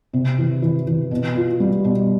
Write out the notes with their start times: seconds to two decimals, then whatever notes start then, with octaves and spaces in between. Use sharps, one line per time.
0.13 C3
0.38 E3
0.62 E3
0.87 E3
1.11 B2
1.35 F4
1.60 G3
1.84 B2